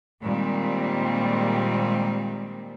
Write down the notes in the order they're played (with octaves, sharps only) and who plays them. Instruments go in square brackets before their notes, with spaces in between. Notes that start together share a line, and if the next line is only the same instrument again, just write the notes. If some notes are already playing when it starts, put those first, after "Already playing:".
[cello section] A#2 D#3 G3 G#3 C4